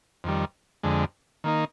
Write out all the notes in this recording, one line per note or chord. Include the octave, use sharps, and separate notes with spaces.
F2 D#3 G3
F2 D3 G#3
D#3 A#3 D#4